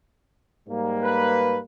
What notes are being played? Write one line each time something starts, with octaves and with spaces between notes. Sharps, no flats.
G#2 G3 A#3
B4